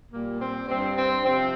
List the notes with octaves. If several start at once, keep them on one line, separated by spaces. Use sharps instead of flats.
A#2 G3 A#3
C4
G2 G3 C4
C4
C3 F3 C4